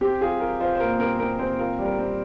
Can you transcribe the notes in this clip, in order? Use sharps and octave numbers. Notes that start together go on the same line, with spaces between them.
C4 G4
F4 G#4
F4 A#4
F4 C5
C5
A#2 A#4
C4 A#4
C4 A#4
C4 C5
F4 A#4
G3
A#4
C4